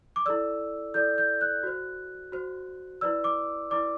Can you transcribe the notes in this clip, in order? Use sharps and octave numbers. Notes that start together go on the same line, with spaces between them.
D6
E4 A4 D5 E6
E4 A4 D5 G6
G6
F#6
F#4 C5
F#4 C5
E4 B4 D5 E6
D6
E4 B4 D5 D6